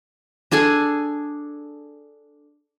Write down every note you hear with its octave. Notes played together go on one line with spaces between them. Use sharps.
D4 G#4 A4 G#5